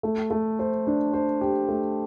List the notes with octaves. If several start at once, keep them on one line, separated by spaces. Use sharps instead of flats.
A3
A3
C5
D4
C5
G4
A3